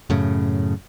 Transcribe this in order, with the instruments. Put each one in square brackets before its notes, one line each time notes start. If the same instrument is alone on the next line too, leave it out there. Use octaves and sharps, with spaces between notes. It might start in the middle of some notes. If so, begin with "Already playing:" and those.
[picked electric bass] F#2 A2 C#3